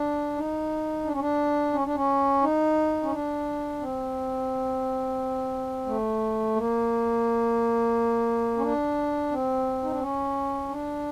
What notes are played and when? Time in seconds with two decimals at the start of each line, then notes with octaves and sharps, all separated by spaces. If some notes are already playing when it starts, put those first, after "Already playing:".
Already playing: D4
0.36 D#4
1.05 D4
1.12 C#4
1.20 D4
1.73 C#4
1.85 D4
1.95 C#4
2.42 D#4
3.03 C#4
3.12 D4
3.80 C4
5.86 A3
6.56 A#3
8.58 C#4
8.62 D4
9.31 C4
9.83 D#4
9.91 D4
10.01 C#4
10.69 D4